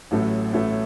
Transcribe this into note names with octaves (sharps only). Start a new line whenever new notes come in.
A1 A2 F#3 A3
A1 A2 F#3 A3